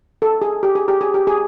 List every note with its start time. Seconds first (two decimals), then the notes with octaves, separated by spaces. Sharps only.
0.22 A4
0.42 G#4
0.63 G4
0.75 G#4
0.88 G4
1.01 G#4
1.14 G4
1.27 G#4